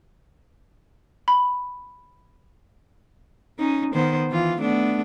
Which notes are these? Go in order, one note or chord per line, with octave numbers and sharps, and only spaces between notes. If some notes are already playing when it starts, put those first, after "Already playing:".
B5
C#4 D#4
D#3 B3 C5
E3 F4
A3 B3 D4